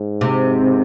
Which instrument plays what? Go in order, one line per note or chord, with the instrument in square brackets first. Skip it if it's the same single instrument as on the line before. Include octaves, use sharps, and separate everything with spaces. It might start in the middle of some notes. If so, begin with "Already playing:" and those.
Already playing: [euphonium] G#2
[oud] C3